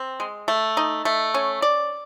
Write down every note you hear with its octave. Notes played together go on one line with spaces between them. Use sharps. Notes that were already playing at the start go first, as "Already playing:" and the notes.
Already playing: C4
G#3
A3
D#4
A3
C#4
D5